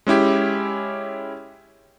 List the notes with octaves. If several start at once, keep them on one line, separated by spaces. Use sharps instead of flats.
G#3 C#4 E4 G4